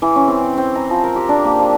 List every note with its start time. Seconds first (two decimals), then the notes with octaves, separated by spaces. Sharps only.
0.02 E3
0.16 C#4
0.28 C4
0.40 G5
0.58 C4
0.75 A#5
0.90 F3
1.04 A#4
1.16 G4
1.29 D4
1.44 A#3
1.59 F3